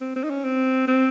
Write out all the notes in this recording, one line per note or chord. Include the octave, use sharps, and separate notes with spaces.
C4
C4
D#4
C#4
C4
C4